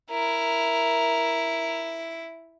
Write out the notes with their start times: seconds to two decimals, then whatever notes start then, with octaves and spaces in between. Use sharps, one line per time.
0.10 E4 A#4